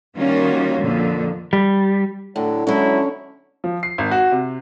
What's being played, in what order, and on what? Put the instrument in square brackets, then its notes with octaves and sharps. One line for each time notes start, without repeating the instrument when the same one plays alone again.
[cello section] D#3 G3 A#3 C#4 F4 F#4
F2 A#2 D3
[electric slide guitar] G3
[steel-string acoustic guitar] A2 [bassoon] D3 [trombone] F#3
[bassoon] D3 [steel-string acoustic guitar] F#3 G#3 [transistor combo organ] C#4 [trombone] E4
[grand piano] F3
C7
G#1
F#4
C3